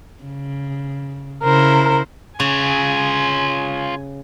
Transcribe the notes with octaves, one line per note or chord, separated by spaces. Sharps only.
C#3
C#3 E4 A#4 C5
C#3 F4 C#5 G#5